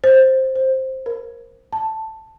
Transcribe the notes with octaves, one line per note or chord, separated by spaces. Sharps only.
C5
C5
A#4
A5